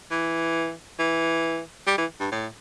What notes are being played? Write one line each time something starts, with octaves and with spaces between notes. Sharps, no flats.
E3
E3
G3
E3
G2
A2